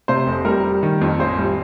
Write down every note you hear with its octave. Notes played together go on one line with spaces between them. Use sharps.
C3 C5
F1
G3 A#4
G3
D#3
F2
A1 C5
G3